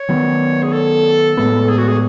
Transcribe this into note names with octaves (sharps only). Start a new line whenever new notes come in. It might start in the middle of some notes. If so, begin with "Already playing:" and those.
Already playing: C#5
D#3 F#3 B3
G#4
A4
A2 G#3 B3 A4
G#4
F#4
G#4